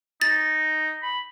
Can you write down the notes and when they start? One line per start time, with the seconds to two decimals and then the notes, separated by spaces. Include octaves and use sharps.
0.21 D#4 A6
1.03 B5